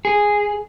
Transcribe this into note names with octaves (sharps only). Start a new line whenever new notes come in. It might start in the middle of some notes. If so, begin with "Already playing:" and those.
G#4